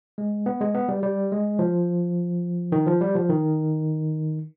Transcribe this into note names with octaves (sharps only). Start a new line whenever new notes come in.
G#3
B3
G#3
B3
G3
G3
G#3
F3
D#3
F3
G3
F3
D#3